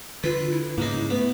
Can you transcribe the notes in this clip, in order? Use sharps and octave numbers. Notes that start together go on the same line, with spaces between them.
D3 F4 B4
E4
G#2 C#3 A#3 D#4
A3 B3